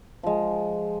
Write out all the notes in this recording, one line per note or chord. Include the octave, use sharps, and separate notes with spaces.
F3 G#3